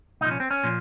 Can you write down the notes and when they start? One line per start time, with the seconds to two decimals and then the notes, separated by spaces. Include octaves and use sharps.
0.21 C2 A#2 F3 D#4
0.31 C#4
0.40 C4
0.51 C#4
0.64 A#2 F3